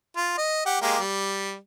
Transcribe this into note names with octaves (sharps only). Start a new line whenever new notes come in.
F4
D#5
G4 F#5
G#3 A#3 G4
G3